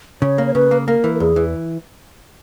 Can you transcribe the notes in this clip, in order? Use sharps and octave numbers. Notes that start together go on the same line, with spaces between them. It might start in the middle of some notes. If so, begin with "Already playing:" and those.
C#3 C#5
A#3
C#5
C#3 B4
A#3
A#3 A#4
E3
A#4
E2 G#4
E3